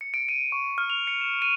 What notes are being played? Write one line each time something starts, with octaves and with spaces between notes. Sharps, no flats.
C#7
D7
D#7
C#6
F6
F7
C#7
E7
D#7